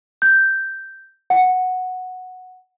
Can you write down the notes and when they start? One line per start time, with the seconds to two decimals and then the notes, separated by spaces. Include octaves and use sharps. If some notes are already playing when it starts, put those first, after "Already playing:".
0.22 G6
1.30 F#5